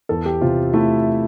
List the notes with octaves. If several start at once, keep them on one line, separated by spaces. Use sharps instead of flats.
E2 A4
G4
C3 F4
A3 E4